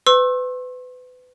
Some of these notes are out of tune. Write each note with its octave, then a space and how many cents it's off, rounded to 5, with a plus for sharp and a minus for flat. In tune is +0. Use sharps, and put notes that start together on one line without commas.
B4 +30 C6 +45 E6 +0